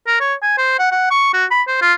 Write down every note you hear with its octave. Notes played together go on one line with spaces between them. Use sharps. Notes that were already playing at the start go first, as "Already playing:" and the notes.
A#4
C#5
G#5
C5
F#5
F#5
C#6
F#4
B5
C5
F4